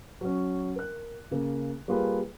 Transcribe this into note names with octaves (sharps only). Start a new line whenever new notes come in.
F#3 C#4
A#4 F#6
C#3 A#3
G3 A#3 F4 G#4 B4